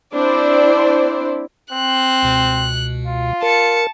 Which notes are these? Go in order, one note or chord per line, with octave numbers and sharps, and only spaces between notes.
C4 D4 E4 C5 D5
C4 F#6
C#2 B2
F4
A#4 A5 C#7